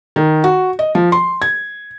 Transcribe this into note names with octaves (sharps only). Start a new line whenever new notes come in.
D#3
F#4
D#5
F3
C6
G#6